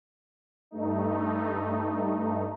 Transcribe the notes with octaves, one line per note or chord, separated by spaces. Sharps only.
G2 A3 D#4